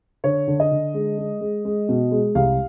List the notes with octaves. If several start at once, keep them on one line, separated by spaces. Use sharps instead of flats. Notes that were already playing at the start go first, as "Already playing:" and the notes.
D3 C#5
D3
D#5
D3
G#3
G#3
G#3
G#3
B2
G#3
C2 F5